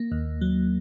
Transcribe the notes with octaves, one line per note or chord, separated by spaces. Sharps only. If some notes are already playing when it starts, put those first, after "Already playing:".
Already playing: A#3
D#2
F#3